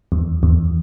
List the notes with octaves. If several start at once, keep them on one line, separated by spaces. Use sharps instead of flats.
E2
E2